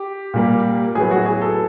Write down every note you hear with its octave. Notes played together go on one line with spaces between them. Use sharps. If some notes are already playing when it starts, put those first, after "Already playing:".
Already playing: G4
A#2 G3 A#3
A2 F#3 B3 G#4
F#4
G#4
A4